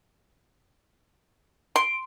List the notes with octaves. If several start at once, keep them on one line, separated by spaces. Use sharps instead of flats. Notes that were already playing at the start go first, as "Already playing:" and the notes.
C6 D7